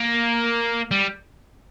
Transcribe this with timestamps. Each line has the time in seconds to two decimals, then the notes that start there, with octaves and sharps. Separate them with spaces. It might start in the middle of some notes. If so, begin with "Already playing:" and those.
Already playing: A#3
0.91 G3